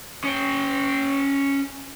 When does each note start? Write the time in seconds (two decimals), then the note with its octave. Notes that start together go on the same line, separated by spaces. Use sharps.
0.24 C#4 G5